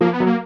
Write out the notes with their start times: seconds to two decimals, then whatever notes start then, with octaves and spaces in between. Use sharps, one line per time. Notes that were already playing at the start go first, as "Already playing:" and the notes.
0.01 F3 A#3
0.13 B3
0.20 F#3
0.26 A#3